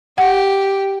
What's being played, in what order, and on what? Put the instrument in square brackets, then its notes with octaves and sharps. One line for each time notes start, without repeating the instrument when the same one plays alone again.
[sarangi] G4 [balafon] F#5